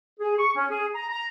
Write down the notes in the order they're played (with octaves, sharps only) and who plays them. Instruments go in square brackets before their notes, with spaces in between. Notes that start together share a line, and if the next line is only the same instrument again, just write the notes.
[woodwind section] G#4
C#6
C#4
G#4
A#5
A#5